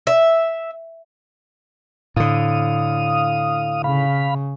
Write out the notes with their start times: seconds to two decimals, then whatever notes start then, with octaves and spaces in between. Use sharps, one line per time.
0.07 E5
2.16 A2 D3 F5 D#6
3.84 C#3 F5 B5